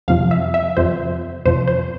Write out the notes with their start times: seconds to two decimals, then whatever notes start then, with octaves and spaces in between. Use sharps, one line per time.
0.08 F2 C3 F3 F5
0.31 E5
0.54 E5
0.77 F2 C3 F3 C5
1.46 F2 C3 F3 C5
1.68 C5